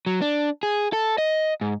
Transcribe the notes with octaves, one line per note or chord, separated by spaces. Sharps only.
F#3
D4
G#4
A4
D#5
G#2